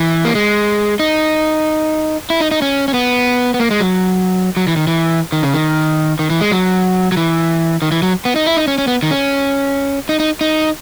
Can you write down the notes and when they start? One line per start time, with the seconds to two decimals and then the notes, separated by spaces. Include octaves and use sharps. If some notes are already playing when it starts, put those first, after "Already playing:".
Already playing: E3
0.25 A#3
0.35 G#3
0.99 D#4
2.30 E4
2.41 D#4
2.51 D#4
2.62 C#4
2.88 C#4
2.94 B3
3.54 B3
3.60 A#3
3.71 G#3
3.80 F#3
4.57 F#3
4.67 E3
4.77 D#3
4.87 E3
5.32 D#3
5.43 C#3
5.54 D#3
6.19 D#3
6.30 E3
6.41 G#3
6.52 F#3
7.12 F#3
7.17 E3
7.82 D#3
7.92 E3
8.02 F#3
8.25 B3
8.36 D#4
8.46 E4
8.57 D#4
8.68 C#4
8.78 C#4
8.87 B3
9.03 D#3
9.11 C#4
10.09 D#4
10.20 D#4
10.41 D#4